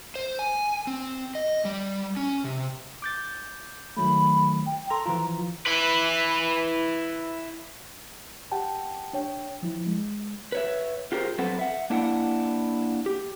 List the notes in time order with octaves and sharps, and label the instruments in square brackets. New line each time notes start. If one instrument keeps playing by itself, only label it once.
[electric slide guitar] C5
G#5
C4
D#5
G3
C#4
C3
[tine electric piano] D6 G6 A6
[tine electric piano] D#3 F#3 A3 [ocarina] B5
[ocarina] G5
[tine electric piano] A4 A#5 [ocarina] C6
[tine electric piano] E3 F3 F4 [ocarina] A#5
[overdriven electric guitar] E4 B4
[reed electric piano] G4 F#5 G5 A5
D4 C#5 G5
F3 E4
G#3
[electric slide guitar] B4 C#5 E5
F4 G4 G#4 A#4 C5
F#3 C4 A4 B4 F#5
E5 F#5
A#3 D4 E4 F5 F#5
G4